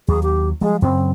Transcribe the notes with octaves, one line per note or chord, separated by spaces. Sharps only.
D#2 F#3 G#4
G4
F3 G3 G#3
F#2 C#3 F#3 C4